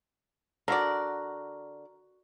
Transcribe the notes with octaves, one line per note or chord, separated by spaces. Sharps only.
D3 F#4 A#4 D5